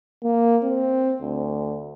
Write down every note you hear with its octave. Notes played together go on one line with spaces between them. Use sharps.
A#3
C4
D2